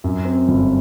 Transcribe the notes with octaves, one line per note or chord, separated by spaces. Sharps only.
F#2
C4
G1